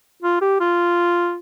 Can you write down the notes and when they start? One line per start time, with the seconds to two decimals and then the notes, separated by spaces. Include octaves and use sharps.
0.22 F4
0.41 G4
0.60 F4